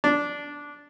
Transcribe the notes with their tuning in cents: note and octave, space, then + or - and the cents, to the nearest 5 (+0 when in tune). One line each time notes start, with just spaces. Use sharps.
D4 -10